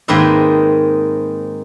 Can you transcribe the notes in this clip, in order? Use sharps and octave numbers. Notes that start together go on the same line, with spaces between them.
G#2 D#3 A#3 C4 B4 E5